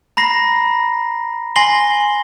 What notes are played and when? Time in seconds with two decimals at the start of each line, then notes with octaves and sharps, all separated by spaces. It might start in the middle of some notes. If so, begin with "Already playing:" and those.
0.17 A#5 B5 A#6 C7
1.56 G#5 C6 A#6 C7 F#7 G7